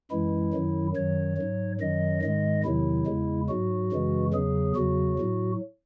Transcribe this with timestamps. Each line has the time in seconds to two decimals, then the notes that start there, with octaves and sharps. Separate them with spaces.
0.11 F#2 E3 G#3 E4
0.53 F#2 D#3 F#3
0.96 F#2 D#3 F#3 C#5
1.38 G#2 F#3
1.80 F#2 D#3 F#3 D#5
2.23 G#2 D#3 G#3 D#5
2.64 E2 C3 D#3 F#3 E4
3.06 E2 C#3 G#3
3.49 G#2 F#3 F#4
3.92 F#2 C#3 E3 G#3
4.33 E2 C#3 F#3 G#4
4.76 E2 C#3 F#3 F#4
5.19 A2 F#3